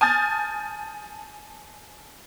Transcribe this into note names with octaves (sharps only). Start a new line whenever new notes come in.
G#5 A5 D#6 F6 G6 A6